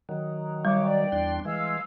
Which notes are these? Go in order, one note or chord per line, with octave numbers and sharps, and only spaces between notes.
D#3 F#3
G3 C#5 C#6 D6
D5 G5
E2 D4 C6
E3 G#3 F5 E6